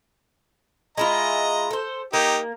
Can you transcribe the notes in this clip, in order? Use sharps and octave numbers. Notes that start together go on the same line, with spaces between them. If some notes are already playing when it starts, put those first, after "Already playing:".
G#3 E4 F4 D#5 A#5
A4 C5
A#3 D#4 G4